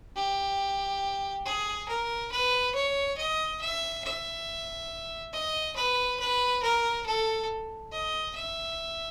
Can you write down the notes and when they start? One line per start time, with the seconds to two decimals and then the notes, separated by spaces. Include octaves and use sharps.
0.16 G4
1.46 G#4
1.88 A#4
2.32 B4
2.75 C#5
3.18 D#5
3.61 E5
4.04 E5
5.33 D#5
5.76 B4
6.19 B4
6.63 A#4
7.06 A4
7.92 D#5
8.35 E5